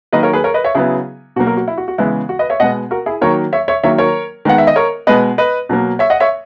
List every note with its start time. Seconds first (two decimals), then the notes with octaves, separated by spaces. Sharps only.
0.13 D#3 F#3 A#3 B4 D#5
0.23 A#4 C#5
0.33 G#4 B4
0.44 A#4 C#5
0.54 B4 D#5
0.64 C#5 E5
0.75 C#3 F#3 B3 E4 G#4
1.36 B2 F#3 A#3 F#4
1.47 F#4 A#4
1.57 F#4
1.68 E4
1.78 F#4
1.88 F#4
1.98 C#3 E3 G#3 B3 E4
2.29 F#4
2.39 B4 D#5
2.50 C#5 E5
2.60 B2 G#3 B3 D#5 F#5
2.91 F#4 A#4
3.06 E4 G#4
3.21 D#3 F#3 A#3 A#4 C#5
3.53 C#5 E5
3.68 C#5 E5
3.83 D#3 F#3 A#3 C#5 E5
3.98 A#4 C#5
4.45 D#3 G#3 B3 F#5
4.58 E5
4.67 D#5
4.76 A#4 C#5
5.07 B2 G#3 B3 B4 D#5
5.38 B4 D#5
5.69 B2 F#3 A#3
5.99 C#5 E5
6.10 D#5 F#5
6.20 C#5 E5